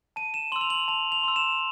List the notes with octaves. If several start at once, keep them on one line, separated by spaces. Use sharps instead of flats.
A5 D#7
E7
C6 E6 F#7
F7
F#7
A5 F7
F7
C6 E6
E7